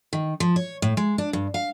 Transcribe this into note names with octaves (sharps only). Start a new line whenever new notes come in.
D#3
F3
C#5
A2
G#3
D4
G2
F5